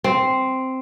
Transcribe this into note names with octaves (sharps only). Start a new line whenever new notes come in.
C4